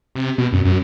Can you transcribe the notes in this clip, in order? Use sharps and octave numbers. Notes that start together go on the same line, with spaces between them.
C3
B2
F#2
F#2